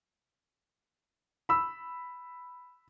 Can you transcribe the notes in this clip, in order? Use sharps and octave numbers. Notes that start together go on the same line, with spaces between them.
B5 E6